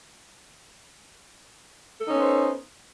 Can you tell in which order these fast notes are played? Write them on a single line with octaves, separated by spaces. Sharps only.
A4 D#4 C#4 B3 C5